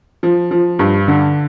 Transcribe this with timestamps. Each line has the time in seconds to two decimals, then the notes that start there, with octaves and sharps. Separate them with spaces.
0.23 F3
0.51 F3
0.79 G2
1.08 D3